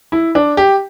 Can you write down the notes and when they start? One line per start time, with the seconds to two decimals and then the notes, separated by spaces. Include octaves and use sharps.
0.12 E4
0.35 D4
0.57 G4